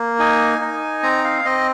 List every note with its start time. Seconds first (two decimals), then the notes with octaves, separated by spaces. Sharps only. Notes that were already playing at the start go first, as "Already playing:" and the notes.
Already playing: A#3
0.19 D#4 G#5
0.61 D#4
1.03 C4 A#5
1.24 F5
1.44 C4 D#5